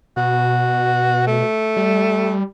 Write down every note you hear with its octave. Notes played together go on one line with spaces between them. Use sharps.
B2 F#4
A3
G3